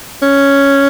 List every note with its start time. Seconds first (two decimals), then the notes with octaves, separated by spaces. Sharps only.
0.22 C#4